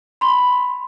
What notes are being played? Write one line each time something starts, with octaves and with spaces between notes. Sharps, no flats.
B5 C6